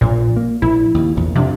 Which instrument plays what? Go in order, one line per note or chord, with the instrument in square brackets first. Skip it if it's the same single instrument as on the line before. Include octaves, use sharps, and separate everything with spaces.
[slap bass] A#1 [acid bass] A#2
[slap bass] A#3
[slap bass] A#1 [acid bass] E4
[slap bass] D#2
A#1 E2 A#2
[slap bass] F2 D4 [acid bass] C3